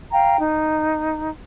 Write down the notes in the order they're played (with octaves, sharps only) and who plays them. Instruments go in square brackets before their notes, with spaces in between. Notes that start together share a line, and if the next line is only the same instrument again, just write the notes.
[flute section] F5 G5 A#5
D#4